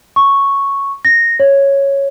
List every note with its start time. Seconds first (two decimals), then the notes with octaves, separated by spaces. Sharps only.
0.16 C#6
1.05 A#6
1.40 C#5